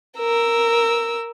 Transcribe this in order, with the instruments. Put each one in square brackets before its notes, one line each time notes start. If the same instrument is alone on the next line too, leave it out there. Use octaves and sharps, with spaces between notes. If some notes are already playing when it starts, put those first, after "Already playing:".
[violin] A#4 E6